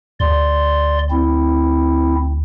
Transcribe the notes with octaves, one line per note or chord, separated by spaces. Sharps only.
D2 D5 C6
C4 E4